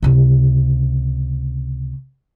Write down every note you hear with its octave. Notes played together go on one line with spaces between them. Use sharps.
C#2 C3